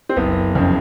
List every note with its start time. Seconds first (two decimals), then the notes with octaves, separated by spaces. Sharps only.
0.09 C4
0.16 F#1 B3
0.55 F2 C#3